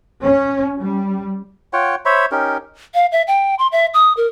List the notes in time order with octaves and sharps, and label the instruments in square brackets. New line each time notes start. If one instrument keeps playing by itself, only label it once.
[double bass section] C#4
G3
[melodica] F4 C#5 F#5 G5
C5 C#5 E5 B5
C#4 D#4 G4 A#4
[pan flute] F5
E5
G5
C6
E5
D#6
A#4